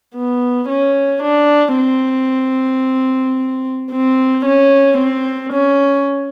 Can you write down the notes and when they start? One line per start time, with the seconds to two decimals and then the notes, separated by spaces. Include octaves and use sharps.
0.15 B3
0.69 C#4
1.22 D4
1.76 C4
3.91 C4
4.45 C#4
4.98 C4
5.52 C#4